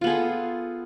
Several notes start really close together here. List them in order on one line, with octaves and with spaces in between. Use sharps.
F4 B3 G#4 A4